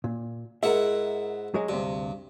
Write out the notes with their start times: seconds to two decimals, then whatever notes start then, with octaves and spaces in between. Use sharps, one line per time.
0.04 A#2
0.63 G#2 E4 A#4 E5 F#5
1.54 F#3 G#3
1.69 D2 G2 C3